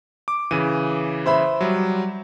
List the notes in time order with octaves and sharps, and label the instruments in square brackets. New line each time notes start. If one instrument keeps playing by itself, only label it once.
[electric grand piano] D6
[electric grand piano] C#3 E3 [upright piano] D#7
[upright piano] C5 E5 B5
[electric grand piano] F#3 G3